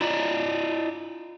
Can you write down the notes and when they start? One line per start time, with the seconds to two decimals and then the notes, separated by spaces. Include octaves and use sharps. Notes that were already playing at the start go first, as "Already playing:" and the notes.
0.01 E4 F4 D5 D#5 A#5